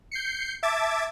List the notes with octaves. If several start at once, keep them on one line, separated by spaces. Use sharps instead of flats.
G6 C7 C#7
E5 A5 D6 G#6 A6